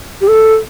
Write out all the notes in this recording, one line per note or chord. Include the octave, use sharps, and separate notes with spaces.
G4
A4